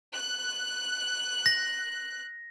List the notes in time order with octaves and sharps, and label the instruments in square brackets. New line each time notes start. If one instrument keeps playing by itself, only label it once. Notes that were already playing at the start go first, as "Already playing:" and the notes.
[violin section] F#6
[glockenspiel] A#6